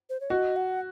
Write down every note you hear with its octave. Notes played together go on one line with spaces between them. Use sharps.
C5
C#5
F#4 D#5
F#5